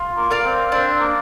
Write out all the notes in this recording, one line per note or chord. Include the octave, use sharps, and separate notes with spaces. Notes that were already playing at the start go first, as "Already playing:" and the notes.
Already playing: F4
A#3
A#4 D5 F5
C4
C4 D4
A#3